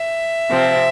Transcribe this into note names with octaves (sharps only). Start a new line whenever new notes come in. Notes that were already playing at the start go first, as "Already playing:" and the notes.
Already playing: E5
C3 F3 C4